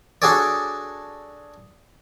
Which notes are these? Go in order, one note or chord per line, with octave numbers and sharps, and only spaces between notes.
D4 F#4 G#4 A4 C#5 D5